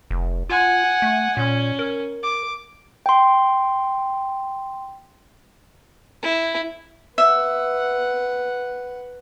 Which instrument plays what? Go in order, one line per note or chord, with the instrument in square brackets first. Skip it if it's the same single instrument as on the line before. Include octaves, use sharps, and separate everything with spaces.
[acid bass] F1
[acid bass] F4 [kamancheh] F#5 G#5
[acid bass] A3
[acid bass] A#2 [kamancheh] C#4
[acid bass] A#4
[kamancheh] D6
[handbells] G5 C6
[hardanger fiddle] E4
[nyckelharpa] B4 F#5 [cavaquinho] E5